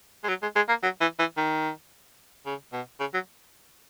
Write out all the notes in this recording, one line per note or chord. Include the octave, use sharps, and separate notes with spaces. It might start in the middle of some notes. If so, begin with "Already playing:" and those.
G#3
F#3
G#3
G#3
A#3
F#3
E3
E3
D#3
C#3
B2
C#3
F#3